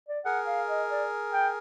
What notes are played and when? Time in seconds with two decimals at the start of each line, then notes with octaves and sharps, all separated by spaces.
0.09 D5
0.25 G#4 A#4 F#5
0.47 F5
0.68 D#5
0.89 D5
1.32 G5